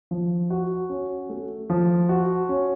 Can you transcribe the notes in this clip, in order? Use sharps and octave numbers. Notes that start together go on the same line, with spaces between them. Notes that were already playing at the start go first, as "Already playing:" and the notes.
F3
F#4
C#4
A3
F3
F#4
C#4